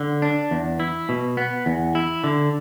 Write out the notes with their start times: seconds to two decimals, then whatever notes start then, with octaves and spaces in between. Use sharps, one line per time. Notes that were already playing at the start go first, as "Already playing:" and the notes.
Already playing: D3
0.22 D4
0.51 E2
0.80 E4
1.09 B2
1.37 B3
1.66 E2
1.95 E4
2.24 D3